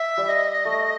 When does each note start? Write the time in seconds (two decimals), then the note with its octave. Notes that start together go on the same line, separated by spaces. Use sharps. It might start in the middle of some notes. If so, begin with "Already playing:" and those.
Already playing: E5
0.17 G3
0.29 D#5
0.65 A3